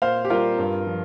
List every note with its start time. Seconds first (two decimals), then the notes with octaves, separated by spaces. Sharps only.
0.02 A#2 C5 F5
0.25 G4
0.30 G3 F4 A#4
0.58 G2
0.87 F3